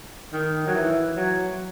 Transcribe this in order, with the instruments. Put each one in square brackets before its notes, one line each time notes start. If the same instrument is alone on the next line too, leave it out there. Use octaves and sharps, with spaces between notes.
[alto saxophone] D#3
F#3
E3
F#3